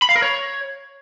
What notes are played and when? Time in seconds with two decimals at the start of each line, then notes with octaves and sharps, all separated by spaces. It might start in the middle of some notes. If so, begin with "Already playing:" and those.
0.02 B5
0.09 F5
0.16 A#4
0.22 C#5